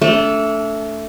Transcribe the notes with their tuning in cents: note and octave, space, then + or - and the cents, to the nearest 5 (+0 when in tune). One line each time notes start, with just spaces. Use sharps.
A3 +5 D4 -35